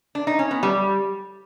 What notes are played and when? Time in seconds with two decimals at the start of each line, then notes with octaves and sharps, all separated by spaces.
0.15 D4
0.27 D#4
0.39 C#4
0.51 B3
0.63 G3